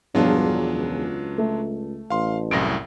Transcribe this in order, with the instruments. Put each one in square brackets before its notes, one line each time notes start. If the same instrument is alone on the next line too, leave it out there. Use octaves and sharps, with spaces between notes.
[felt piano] E1 E2 F3 [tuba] G2 [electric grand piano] F#3 D4 F4
[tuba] C#2
[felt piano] A3
[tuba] A1 [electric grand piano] F5 C6
[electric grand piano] C2 F#2 A2 [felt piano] A#6 D7